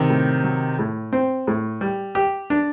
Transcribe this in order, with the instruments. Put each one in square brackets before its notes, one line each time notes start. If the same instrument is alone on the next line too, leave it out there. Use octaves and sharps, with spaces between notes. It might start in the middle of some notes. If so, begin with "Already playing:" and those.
Already playing: [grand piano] C3 D#3
[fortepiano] A2
F#3
A2
C4
A2
G3
G4
D4